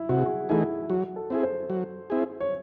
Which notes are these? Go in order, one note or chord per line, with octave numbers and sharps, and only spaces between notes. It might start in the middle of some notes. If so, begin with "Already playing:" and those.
Already playing: E4
C3 F#4
G#4
F#4
E3 A3 D#4 E4 G#4
F#3 F#4
A4
C4 E4 G#4
C5
F#3
C4 E4 G#4
C#5